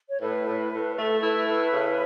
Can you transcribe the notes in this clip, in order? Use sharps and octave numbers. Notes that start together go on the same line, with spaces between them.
C#5
A2 B4
A2
A2
A3 A4
E4 B4
A2 B4
C#3